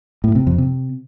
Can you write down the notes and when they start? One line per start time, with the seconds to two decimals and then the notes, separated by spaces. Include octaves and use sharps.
0.24 A2
0.35 C3
0.47 F2
0.58 C3